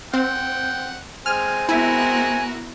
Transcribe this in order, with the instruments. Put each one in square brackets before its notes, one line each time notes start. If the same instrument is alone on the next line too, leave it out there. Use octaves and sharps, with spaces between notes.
[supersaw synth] C4 [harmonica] F#5 G5
[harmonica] G#3 C4 [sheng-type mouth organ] G#5 [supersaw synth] F6
[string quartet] B3 F#4 A#4 [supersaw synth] E4 [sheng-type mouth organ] G#5